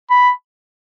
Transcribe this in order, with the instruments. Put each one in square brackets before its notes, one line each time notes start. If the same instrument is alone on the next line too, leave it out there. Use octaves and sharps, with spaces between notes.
[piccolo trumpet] B5